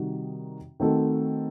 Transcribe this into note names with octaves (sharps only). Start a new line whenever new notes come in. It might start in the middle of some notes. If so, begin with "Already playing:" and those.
Already playing: C3 D#3 G3 D#4 F#4
D#3 A3 C4 F#4 A4